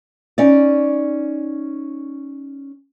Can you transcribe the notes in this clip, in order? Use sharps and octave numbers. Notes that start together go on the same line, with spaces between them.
C#4 D#4 D5